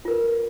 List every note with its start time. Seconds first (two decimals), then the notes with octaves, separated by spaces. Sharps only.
0.05 F4
0.08 A#4
0.11 B4